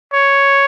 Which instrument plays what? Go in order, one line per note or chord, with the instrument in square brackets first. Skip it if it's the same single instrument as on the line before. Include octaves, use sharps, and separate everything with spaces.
[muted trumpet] C#5